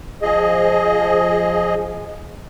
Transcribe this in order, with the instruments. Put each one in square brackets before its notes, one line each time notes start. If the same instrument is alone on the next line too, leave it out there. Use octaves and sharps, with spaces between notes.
[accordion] F3 G#4 D#5